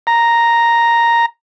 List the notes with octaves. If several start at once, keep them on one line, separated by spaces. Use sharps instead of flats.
A#5